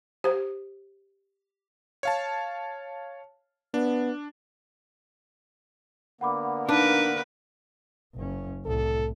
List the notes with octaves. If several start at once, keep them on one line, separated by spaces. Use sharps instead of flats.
G4 C5
C#5 F5 A5
B3 D4
D3 A#3 B3 F#5 B5 D6
D4 D#4 A#4 B4 F5
F#1 C#4
C2 A2 A4